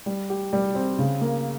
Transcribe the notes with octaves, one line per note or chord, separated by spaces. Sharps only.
G3
G4
G3
C4
C#3
A#3